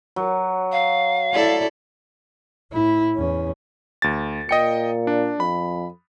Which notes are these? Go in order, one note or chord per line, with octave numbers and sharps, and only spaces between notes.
F#3
F5
E4 A4 D5
A2 E4
E2 C#4
D2 A6
A#2 D#5 G5 C#7
D4
F2 B5